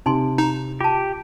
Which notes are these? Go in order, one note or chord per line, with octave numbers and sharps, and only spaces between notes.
C3 D#4 G#5 C6
D#4 A#5
F4 G4 A5